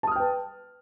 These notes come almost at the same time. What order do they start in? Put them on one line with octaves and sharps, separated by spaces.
A5 D#6 F6 G5 B4